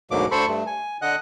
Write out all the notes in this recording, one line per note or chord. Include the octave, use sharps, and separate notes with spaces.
D2 G#2 B2 F#3 A#3 D6
D2 A4 C5 B5 C#6
G2 A3
G#5
D3 D#5 F#5 F#6